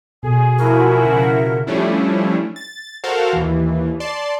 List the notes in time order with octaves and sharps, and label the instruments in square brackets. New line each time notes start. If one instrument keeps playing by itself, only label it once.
[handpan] B2 A4 [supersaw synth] G#4 [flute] G#5
[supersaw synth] F3 E4 F#4 [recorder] A#4
[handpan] C#3
[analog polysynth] F3 G3 A3 C#4 D4 E4
A6
F#4 A4 A#4 C5 F5
D#2 E3
D5 A5 C6